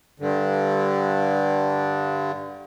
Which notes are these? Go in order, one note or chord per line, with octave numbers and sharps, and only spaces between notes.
G2 D3